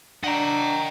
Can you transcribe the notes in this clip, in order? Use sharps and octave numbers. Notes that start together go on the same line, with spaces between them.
D4 D#5 F#5 G5 A#5